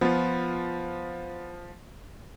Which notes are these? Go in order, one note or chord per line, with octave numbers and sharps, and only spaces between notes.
F3 B3 F4